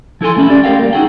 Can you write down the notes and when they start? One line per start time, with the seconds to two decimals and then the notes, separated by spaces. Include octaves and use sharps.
0.21 F3 E4 A4 G#5 C6
0.36 A3 C#4 E4
0.48 C#4 G4 D5
0.64 G4 A#4 F5 G5
0.80 G3 A#3
0.93 D#4 E4 F#4 G#4 G5